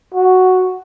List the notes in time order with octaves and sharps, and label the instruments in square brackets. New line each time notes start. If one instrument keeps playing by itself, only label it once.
[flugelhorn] F#4